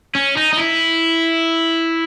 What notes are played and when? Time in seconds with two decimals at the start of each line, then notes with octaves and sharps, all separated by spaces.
0.15 C#4
0.37 D#4
0.53 D#4
0.58 E4